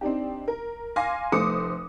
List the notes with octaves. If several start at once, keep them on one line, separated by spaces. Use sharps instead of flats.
C4 D4 D#4 G4
A#4
F5 G#5 C6 D6 A#6
F1 A3 C5 D6 D#6 C#7